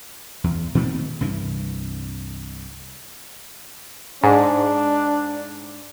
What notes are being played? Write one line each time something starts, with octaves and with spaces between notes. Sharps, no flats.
E2
A#2 D#3 A3 C4
C2 G2 E3
G#2 D4